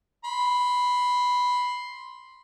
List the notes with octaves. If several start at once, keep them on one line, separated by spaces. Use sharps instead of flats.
B5 C6